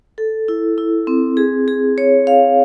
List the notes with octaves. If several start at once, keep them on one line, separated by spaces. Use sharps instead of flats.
A4
E4
E4
C4
G#4
G#4
C#5
F5